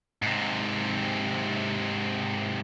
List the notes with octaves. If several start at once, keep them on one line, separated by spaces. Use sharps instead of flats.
G#2 C3